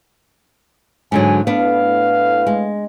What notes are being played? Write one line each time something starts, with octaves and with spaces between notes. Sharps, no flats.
G#2 D3 F#3 G#5
A2 B3 D4 B4 F5
G#3